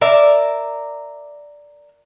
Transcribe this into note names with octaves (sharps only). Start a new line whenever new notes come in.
A#4 D5 E5